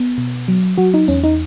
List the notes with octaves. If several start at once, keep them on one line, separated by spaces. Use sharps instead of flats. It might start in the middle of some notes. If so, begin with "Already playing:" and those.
Already playing: B3
B2
F#3
F#3 F#4
D#4
E2 C#4
D#4